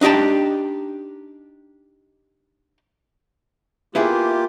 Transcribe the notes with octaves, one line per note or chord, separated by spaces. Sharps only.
D4 D#4 G4 G5 A5
A#3 B3 E4 F4 G4 G#4